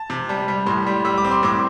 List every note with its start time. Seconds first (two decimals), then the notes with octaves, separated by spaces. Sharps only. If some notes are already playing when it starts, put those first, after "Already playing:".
Already playing: A5
0.10 C3
0.29 G3 A5
0.48 G3
0.66 A2 C6
0.87 G3
1.05 G3 E6
1.18 D6
1.24 C4
1.31 C6
1.43 A2 D6